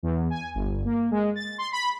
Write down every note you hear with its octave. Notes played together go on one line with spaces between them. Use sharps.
E2
G#5
G1
A#3
G#3
A6
C6
B5